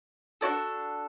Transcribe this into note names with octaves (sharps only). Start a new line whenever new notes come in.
D4 F#4 A4 D5